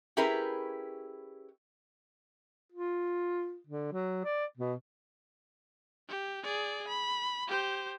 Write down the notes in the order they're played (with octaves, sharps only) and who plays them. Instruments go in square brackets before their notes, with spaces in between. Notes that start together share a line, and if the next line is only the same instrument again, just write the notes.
[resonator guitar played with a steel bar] C#4 E4 G4 G#4 A#4 B4
[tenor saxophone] F4
D3
F#3
D5
B2
[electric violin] G4
G#4 D5
B5
G4 C5